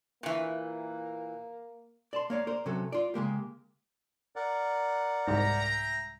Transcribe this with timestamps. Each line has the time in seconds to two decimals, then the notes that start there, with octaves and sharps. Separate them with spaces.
0.23 A#2 E3 A#3
2.13 D5 A5 C6
2.30 A#3 C#5 D5 F5
2.47 A#4 C5 D5
2.66 C3 F#3 C#4 A4
2.92 F4 D5
3.14 C#3 G#3 A#3 G4
4.36 A#4 D5 F#5
5.28 C2 G#2 E5 G5 A#5